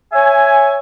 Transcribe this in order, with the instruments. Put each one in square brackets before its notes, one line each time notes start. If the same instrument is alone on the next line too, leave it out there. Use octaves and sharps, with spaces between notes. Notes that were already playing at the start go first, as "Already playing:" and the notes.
[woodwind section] C#5 E5 G#5